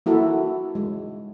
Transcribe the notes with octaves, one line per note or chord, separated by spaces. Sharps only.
A#3 E4 F#4 A4
G#3